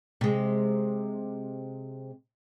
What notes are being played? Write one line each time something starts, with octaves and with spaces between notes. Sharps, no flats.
C3 G#3